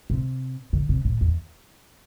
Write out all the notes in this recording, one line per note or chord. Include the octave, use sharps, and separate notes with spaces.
C3
D3
C3
A2
E2